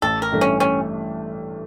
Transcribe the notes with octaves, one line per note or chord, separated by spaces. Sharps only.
A1 A4
A#4
G2 E3 A3
C#4
C#4